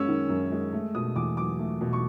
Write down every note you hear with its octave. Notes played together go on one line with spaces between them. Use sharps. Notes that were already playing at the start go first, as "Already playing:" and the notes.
Already playing: F#2 G#3 C#4 E6
D#3
F#2
G#3
A3
B2 D#6
E2 D6
F#3 D6
A3
B2
C#6